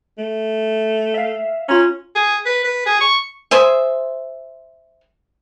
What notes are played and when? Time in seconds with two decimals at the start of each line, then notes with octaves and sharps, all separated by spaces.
0.18 A3
1.14 E5 F5
1.69 C#4 F4 A#5
2.15 G#4
2.46 B4
2.64 B4
2.86 G#4
3.01 C#6
3.51 G#4 C5 E5